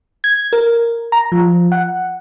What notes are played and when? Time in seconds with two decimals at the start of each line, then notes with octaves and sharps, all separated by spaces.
0.24 G#6
0.53 A#4
1.12 A#5
1.32 F3
1.72 F#5